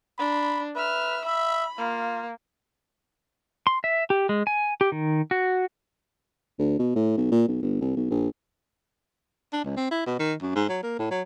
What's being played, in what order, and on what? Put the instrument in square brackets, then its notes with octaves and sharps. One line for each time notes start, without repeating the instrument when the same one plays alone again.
[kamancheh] D4 [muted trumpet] B5
[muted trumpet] B4 [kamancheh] E5 F6
[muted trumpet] E5 [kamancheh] B5
[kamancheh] A#3 [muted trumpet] F4
[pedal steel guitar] C6
E5
G4
G#3
G#5
G4
D#3
F#4
[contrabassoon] D2
B2
A2
B1
A#2
B1
G1
C2
B1
A#1
[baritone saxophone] D4
C#2
C4
E4
B2
D#3
F#2
G#2
F#3
A#3
A2
F#3